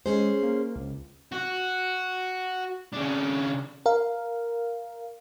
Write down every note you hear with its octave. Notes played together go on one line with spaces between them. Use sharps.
G#3 C#4 G#4 C5
A#3
C#2
F#4
C#3 D4
A#4 F5